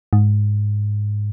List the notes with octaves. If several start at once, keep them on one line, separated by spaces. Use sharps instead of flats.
G#2